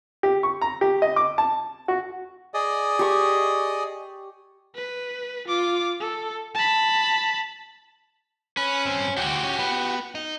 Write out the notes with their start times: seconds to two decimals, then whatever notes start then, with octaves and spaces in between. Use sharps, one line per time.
0.23 G4
0.43 C#6
0.62 A#5
0.81 G4
1.02 D#5
1.16 D6
1.38 A5
1.88 F#4
2.54 G#4 D5 D#5
2.99 G4 C#6
4.75 B4
5.47 F4 D6
6.00 A4
6.55 A5 B5
8.57 C#4 B4
8.86 G2 C4
9.17 D2 F#4 G4
9.43 C#4
9.59 B3
10.15 D#4